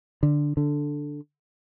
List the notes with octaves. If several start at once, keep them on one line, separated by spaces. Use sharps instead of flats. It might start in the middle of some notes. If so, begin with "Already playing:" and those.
D3
D3